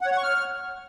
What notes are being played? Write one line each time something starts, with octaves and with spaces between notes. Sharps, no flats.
F#5
C#5
F#5
C#6
F6